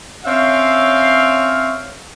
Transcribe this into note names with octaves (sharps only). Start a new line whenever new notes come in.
C4 C#4 C#5 E5 F5